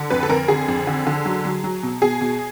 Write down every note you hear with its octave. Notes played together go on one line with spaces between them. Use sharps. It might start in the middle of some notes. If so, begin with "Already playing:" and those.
Already playing: D3
F2 B4
A4
F2 A#4
D3 G#4
F2
D3
D3
F#3
F#3
F#3
B2
B2 G#4
B2